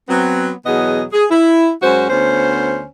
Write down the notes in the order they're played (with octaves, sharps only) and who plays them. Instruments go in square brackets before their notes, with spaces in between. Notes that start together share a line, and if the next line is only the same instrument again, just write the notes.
[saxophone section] F#3 B3 C4
E2 B2 F#3 B3 G#4 D#5
G#4
E4
F#2 G#3 C#4 F#4 C5
D2 B3 C#4 C5